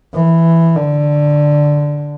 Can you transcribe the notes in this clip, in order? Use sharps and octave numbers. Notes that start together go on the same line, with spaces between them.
E3
D3